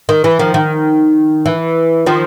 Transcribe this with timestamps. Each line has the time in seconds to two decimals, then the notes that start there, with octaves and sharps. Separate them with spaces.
0.09 D#3
0.24 E3
0.39 D#3 F3
0.54 D#3
1.46 E3
2.06 D#3 F3